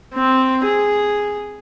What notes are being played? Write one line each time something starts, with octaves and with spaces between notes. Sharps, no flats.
C4
G#4